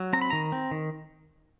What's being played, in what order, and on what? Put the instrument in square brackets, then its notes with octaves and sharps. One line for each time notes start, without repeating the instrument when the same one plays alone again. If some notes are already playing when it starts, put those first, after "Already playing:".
Already playing: [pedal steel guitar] F#3
C4 A#5
B5
D#3 A#5
C4
D#3